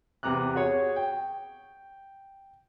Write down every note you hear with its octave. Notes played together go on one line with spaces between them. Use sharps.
E2 C3 A#5 D6 F#6
F#4 G#4 C#5
G5